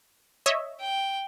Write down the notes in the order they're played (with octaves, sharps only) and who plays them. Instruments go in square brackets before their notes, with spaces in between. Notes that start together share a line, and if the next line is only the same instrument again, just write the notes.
[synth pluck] C#5 D#5 E5
[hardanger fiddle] G5